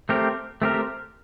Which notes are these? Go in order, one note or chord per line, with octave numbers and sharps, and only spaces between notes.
A3 C4 G4 A#4
A3 C4 G4 A#4